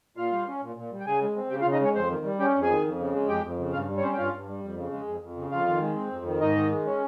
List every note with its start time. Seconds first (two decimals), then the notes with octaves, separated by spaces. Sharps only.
0.17 A#2 F4 F5
0.31 G3
0.47 C#4
0.62 A#2
0.77 A#2
0.91 G3
1.00 G5
1.06 C#3 G#4 G#5
1.21 G#3
1.36 C4
1.50 C#3 G4 G5
1.61 F4 F5
1.65 C#3
1.72 D#4 D#5
1.81 G#3 C#4 C#5
1.95 F2 C4 C5
2.10 D#3
2.25 G3
2.39 C#4 G4 G5
2.55 F2
2.62 G#4 G#5
2.69 D#3
2.85 F2
2.99 C#3
3.14 G#3
3.29 F2 G4 G5
3.44 F2
3.59 C#3
3.73 G2 F4 F5
3.88 G3
3.97 C#5
4.03 C4 C#4 C5
4.13 G5
4.18 G2 F4 F5
4.33 G2
4.49 G3
4.63 F2
4.77 C#3
4.92 G#3
5.08 F2
5.22 F2
5.37 C#3
5.52 F2 F4 F5
5.67 D#3
5.81 G#3
5.96 C4
6.12 F2
6.26 D#3
6.41 G#2 D#4 D#5
6.55 D#3
6.71 G#3
6.86 C#4